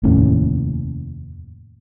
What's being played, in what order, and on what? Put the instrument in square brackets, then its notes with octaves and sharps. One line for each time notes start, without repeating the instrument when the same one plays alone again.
[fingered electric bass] F1 D#2 A2 C#4